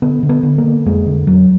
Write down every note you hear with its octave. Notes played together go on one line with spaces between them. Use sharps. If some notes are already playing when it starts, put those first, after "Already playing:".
D3 B3
D3
B3
D3
A#3
D3
F2 G#3
D3
F2 F#3